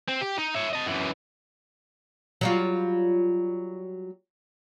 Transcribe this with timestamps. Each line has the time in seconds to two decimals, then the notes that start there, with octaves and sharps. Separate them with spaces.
0.08 C4
0.21 G4
0.38 D#4
0.54 C#5 E5
0.73 D#5 A5
0.86 F#2 E3
2.41 F#3 G3 F4